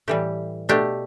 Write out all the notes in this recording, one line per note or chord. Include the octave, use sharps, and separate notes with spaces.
A2 E3 G3 G4
B2 A3 D4 G4